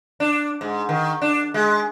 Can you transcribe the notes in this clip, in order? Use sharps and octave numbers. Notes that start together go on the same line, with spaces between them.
D4
G#2
D#3
D4
G#3